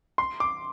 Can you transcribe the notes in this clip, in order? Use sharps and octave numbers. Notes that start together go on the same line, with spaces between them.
C6
D6